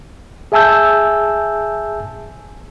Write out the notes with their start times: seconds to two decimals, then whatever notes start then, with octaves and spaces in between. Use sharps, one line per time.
0.52 G#4 E5 G#5 A5 E6 G6